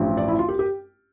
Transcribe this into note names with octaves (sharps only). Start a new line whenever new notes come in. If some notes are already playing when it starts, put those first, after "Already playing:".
Already playing: A1 G2 F3
D5
E4
F4
G4
G4